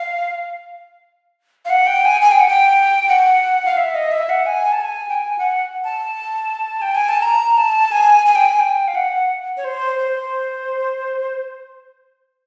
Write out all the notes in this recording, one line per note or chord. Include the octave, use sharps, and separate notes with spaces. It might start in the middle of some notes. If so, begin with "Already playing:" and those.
Already playing: F5
F5
F#5
G5
G#5
G#5
G5
F#5
G5
F#5
F5
E5
D#5
E5
F#5
G#5
A5
G#5
G5
G#5
F#5
A5
G5
G#5
A5
A#5
A5
G#5
G#5
G5
G#5
G5
F5
F#5
C#5
C5
C5